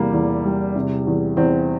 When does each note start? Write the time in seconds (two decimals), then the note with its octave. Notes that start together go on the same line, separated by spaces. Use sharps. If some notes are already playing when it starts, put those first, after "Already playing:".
Already playing: E2 C3 G3 A#3
0.13 E2
0.44 G3
0.76 C3
1.07 E2
1.37 E2 C4